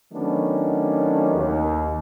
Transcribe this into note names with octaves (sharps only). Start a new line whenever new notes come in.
D#3 F#3 A3 B3 C#4 D4
D#2